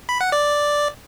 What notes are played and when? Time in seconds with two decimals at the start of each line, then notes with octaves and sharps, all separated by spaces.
0.09 B5
0.21 F#5
0.32 D5